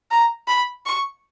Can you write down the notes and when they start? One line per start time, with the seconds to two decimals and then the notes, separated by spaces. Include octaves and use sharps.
0.11 A#5
0.48 B5
0.86 C#6